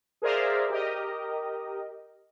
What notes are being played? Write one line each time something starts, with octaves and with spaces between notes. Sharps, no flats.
G#4 A#4 C5 D5 E5 F5
G4 A#4 D#5